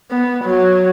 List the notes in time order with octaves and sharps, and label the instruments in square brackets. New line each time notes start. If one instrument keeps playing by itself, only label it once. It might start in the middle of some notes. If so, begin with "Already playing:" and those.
[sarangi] B3
F#3